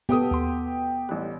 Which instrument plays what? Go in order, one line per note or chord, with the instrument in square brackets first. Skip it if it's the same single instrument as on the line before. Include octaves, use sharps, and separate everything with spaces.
[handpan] B3 A4 [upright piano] G4 G5 D#6
[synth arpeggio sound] D#2 C6
[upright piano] A1 G3 [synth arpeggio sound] F#6